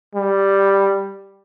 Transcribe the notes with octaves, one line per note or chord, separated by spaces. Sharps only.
G3